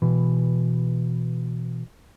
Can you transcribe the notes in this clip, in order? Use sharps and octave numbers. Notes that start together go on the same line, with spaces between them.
B2 E3